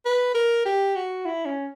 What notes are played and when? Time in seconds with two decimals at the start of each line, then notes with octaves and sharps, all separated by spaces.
0.05 B4
0.35 A#4
0.65 G4
0.95 F#4
1.26 E4
1.45 C#4